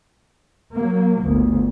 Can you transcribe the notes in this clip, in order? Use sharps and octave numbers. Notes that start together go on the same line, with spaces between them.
F#3 A#3
G1 D2